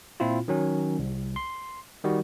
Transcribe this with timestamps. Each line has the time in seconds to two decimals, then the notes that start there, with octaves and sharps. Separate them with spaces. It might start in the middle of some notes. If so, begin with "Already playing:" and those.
0.20 A#2 C4 E4 F4
0.48 D#3 F#3 C#4
0.99 C2
1.36 C6
2.04 D#3 G3 F#4